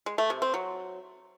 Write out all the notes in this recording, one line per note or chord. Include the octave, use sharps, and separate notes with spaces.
G#3
A3
C3
C4
F#3